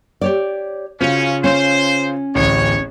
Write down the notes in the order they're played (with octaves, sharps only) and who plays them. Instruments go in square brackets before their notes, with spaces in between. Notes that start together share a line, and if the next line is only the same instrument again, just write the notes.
[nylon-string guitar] G4 C#5 D5
[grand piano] C#3 F4 [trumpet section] C#4 [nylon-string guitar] F#4 C5
[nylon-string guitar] C#4 [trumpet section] C5
[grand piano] D1 A1 [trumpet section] C#5